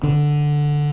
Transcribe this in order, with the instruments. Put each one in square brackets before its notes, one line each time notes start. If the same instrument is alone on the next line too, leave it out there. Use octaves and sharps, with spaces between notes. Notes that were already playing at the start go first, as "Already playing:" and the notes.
[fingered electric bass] D3